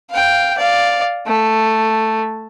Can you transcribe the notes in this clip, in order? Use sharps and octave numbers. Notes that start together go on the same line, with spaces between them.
F5 G5
D5 F5
A3